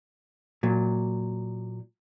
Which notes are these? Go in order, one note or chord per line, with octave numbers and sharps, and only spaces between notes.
A#2 F#3